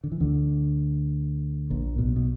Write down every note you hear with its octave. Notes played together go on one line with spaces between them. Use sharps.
D3
E3
D2 D3
A#1 A#2
B1 B2
B2